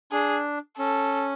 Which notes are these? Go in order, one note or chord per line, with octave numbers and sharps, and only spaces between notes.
D4 G#4
C#4 A4